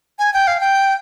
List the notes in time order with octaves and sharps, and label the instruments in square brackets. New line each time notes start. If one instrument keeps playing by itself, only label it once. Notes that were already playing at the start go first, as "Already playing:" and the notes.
[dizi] G#5
G5
F5
G5